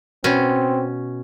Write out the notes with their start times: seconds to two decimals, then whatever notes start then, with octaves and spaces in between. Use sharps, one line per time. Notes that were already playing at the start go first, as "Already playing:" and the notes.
0.24 B2 C4 C#4